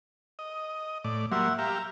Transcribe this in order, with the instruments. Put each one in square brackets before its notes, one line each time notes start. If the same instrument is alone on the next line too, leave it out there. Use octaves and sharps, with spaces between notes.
[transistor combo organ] D#5
A2 D5
[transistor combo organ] F#3 G3 A#3 [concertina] E5 F#5 C6
[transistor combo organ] G4 E5 F5 [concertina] A#5